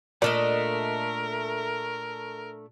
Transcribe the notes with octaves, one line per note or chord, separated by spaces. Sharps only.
A#2 A3 D4 A#4 D5 D#5